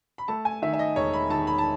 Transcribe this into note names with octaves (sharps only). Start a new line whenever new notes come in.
B5
A3 A5
G#5
D#3 E5
E5
D#5
E1 C#5
B5
D#3 A5
B5
A5